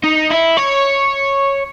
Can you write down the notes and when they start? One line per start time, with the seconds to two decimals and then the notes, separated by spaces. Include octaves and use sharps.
0.04 D#4
0.31 E4
0.57 C#5